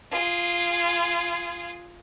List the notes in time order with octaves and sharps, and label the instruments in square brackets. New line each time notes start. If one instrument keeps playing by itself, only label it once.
[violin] F4 G#4